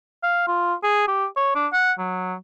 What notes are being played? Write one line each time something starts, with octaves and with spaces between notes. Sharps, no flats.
F5
F4
G#4
G4
C#5
D4
F#5
F#3